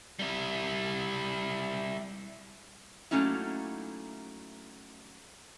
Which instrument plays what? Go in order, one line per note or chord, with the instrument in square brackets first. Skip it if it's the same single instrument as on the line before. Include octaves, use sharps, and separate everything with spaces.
[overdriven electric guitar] G3 E4
[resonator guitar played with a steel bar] F#3 A3 A#3 C#4 D#4 E4